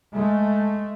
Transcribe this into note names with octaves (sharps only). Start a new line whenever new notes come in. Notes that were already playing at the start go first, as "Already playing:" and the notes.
G#3 A3